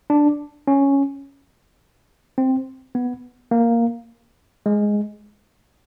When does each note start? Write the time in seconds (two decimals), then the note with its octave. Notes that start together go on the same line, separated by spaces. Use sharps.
0.10 D4
0.67 C#4
2.38 C4
2.95 B3
3.51 A#3
4.66 G#3